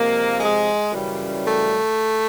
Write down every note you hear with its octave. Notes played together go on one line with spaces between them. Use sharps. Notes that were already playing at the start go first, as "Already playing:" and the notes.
Already playing: C3 F3 G#3 A#3
G#3
F#2 C#3 E3 G3
A3